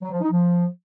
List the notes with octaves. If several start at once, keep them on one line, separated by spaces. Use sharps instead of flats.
F#3
F3
D#4
F3